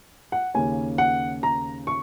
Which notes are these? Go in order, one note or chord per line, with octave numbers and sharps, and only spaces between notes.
F#5
D#2 C#3 A#3 C#4 G#5
F#5
A#5
C#6